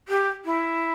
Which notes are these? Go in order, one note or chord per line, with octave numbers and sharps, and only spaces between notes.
G4
E4